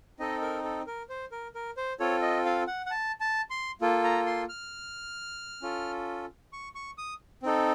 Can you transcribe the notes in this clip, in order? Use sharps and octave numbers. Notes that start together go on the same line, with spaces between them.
C4 D#4 A4 D#5
A#4
A4
A#4
C5
A#4
A#4
C5
C4 F4 A4 C#5
D#5
F5
F#5
F#5
A5
A5
C6
A#3 F4 A4
A#5
C6
F6
C#4 F4 A4
C#6
C#6
D#6
C4 D#4 A4